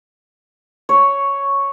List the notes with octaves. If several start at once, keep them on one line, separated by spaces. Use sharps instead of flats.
C#5